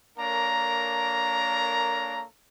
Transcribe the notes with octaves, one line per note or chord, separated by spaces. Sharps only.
A#3 D4 A4 A#4 C#5 A#5